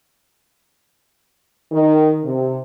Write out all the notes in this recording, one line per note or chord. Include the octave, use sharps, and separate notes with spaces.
D#3
C3